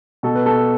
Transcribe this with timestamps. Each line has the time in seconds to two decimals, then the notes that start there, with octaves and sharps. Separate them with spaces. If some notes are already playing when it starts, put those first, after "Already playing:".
0.23 B2 A4
0.35 B4
0.46 A4